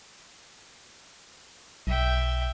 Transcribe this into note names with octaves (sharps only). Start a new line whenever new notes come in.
B1 E5 G5